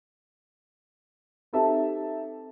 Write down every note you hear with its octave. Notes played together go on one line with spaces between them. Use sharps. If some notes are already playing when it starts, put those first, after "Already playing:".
C4 D#4 G4 A4 E5 A5